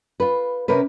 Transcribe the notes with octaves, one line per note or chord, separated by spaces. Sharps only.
F4 B4
C3 C#4 A#4 B4